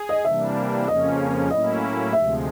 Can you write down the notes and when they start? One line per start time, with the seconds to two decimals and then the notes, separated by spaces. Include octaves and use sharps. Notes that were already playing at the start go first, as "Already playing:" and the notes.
Already playing: G#4
0.09 D#5
0.25 C3 E3 G3 A#3 D4 E5
0.87 F2 C#3 F3 A#3 C#4 D#5
1.50 A2 F#3 A#3 C#4 E4 D#5
2.13 D2 C3 F3 G#3 E5